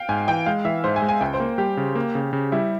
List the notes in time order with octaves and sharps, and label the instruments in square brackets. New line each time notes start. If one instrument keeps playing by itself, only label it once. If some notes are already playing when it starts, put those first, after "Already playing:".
Already playing: [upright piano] F5 G5
[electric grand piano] G#2 [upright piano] G#5
[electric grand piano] E3 [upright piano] G5
[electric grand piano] G#3 [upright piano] F5
[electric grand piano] E3 [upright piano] E5
[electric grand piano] G#2 [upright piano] C5
[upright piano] G#5
[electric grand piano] G#3
[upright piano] G#5
[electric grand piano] C#2 [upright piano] G5
[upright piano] C5
[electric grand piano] A#3
[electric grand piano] G3 [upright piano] G4
[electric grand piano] C#3
A#3
C#3
C#3
[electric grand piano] G3 [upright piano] E4